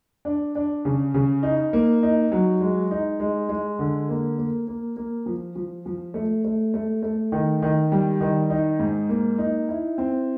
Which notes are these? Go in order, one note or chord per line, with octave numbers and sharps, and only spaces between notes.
D4
D4
C#3
C#3
D#4
A#3
D#4
F#3
G#3
D#4
G#3
G#3
D3
A#3
A#3
A#3
A#3
F3
F3
F3
A3
A3
A3
A3
D#3
D#3
G3
D#3
D#4
G#2
A#3
D#4
E4
C4